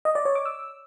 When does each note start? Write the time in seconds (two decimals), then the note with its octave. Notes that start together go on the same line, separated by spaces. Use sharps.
0.05 D#5
0.15 D5
0.25 C#5
0.35 D6
0.45 E6